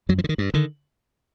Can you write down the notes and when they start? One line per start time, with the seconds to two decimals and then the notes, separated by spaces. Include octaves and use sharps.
0.09 F#2 F#3
0.18 F3
0.24 D3
0.29 D#3
0.38 G2
0.54 D3 D#3